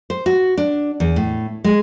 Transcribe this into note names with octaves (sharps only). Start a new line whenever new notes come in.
C5
F#4
D4
E2
A2
G#3